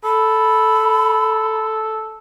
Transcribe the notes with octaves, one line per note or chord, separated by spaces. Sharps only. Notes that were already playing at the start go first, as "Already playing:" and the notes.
A4 B5